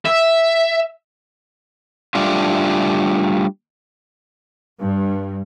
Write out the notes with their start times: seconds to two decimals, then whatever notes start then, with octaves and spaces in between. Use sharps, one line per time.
0.05 E5
2.15 G3 A3 D4 F4
4.81 G2